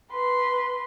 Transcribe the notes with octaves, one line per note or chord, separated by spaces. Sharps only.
B4 C6